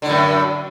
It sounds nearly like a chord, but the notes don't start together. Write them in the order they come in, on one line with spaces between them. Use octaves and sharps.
D3 A2 F#2